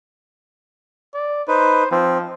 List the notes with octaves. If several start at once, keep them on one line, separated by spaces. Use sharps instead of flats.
D5
D#4 B4 C5
F3 C4